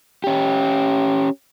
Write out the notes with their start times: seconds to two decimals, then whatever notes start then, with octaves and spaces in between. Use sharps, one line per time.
0.24 C#4 G4